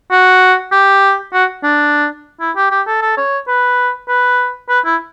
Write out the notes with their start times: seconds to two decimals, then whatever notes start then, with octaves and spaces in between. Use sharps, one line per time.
0.11 F#4
0.72 G4
1.34 F#4
1.64 D4
2.41 E4
2.56 G4
2.71 G4
2.87 A4
3.02 A4
3.17 C#5
3.48 B4
4.09 B4
4.69 B4
4.85 E4